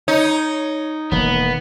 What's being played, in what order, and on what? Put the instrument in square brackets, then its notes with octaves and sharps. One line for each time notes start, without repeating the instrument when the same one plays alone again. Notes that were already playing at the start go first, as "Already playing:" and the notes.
[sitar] D#4 [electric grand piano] C#5
[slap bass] E1 D#3 A#3 [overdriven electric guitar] B3